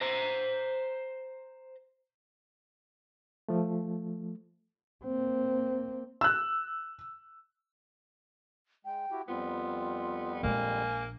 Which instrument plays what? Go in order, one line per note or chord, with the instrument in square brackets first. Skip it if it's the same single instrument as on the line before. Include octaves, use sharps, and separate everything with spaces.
[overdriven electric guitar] C5 A#5
[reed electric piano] F3 A3
[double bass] A#3 C4
[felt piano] E6 F#6
[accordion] G#3 [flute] G5
[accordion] E4 F#4 G4
[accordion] F2 G3 C4 [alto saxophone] B3 [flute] F4
[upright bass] A#1 G#3 [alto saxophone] A#3 [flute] G#5